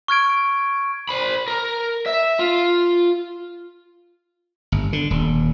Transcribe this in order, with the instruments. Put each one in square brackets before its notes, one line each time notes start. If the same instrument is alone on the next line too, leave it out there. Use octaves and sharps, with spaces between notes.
[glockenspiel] C#6 F6 G#6 D7
[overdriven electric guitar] C5 B5
A#4
E5
F4
[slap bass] G1
D3
D#1